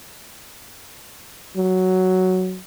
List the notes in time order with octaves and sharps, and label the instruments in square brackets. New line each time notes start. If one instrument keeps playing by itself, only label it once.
[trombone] F#3